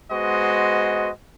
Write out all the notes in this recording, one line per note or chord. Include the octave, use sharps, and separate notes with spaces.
G#3 B3 F#4 C5 D#5